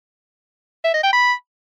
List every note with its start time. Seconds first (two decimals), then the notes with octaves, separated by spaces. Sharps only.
0.84 E5
0.94 D#5
1.04 G5
1.13 B5